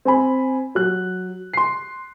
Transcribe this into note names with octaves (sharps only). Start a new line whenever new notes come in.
C4 G#5 B5
F#3 F#6
C6 C7